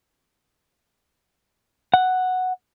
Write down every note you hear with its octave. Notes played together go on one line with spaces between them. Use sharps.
F#5